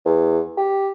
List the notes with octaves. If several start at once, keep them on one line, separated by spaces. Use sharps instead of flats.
E2
G4